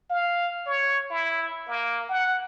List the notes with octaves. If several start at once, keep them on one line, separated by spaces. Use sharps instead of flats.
F5
C#5
E4
A#3
F#5